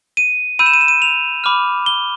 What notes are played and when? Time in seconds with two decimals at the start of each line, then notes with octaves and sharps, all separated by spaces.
0.17 D#7
0.59 B5 E6 G6 D#7
0.66 E7
0.73 D#7
0.81 E7
0.88 D#7
1.02 F7
1.44 B5 D6 F6
1.86 G7